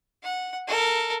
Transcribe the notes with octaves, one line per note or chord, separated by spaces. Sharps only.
F#5
A4 A#4